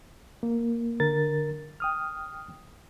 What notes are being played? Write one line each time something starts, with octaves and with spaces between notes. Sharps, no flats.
A#3
D3 A#4 A6
G5 D#6 F6